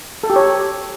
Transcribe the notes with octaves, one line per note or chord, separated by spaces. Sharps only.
A4
G4
C#5